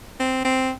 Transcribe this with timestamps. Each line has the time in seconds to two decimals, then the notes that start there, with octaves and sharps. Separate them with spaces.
0.19 C4
0.44 C4